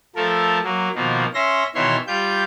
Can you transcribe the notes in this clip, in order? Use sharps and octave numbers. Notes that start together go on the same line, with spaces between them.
F3 A3 A4 A#4
F#3 A#3
B2 D#3 F3 A#3
C#4 E5 C6 A#6
B2 D#3 E3 C#5 E5 C6
G3 F4 G4 G6